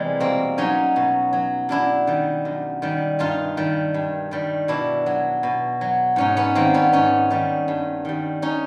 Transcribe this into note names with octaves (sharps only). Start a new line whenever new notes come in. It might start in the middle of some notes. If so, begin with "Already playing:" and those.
Already playing: E2 C3 E3 G3 G#3
B2 A#3 C4
F#3 C#4 D#4
B2
F#3
F#2 D4 E4
D#3 G3
F#2
D#3 G3
G2 D#4 F4
D#3 G3
G2
D#3 G3
B2 D4 E4
F#3
B2
F#3
G#2 C#4 D#4
B3 C#4
D#3 G3 A#3 C4
B3 C#4
G#2 C#4 D#4
D#3 G3
G2
D#3 G3
C#4 D#4